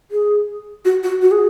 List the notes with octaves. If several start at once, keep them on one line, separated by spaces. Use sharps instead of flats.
G#4
F#4
F#4
F#4
G#4